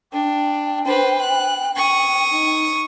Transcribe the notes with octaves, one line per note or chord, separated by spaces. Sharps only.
D4 G5
B4 C5
F#6
C#6 D#6
D#4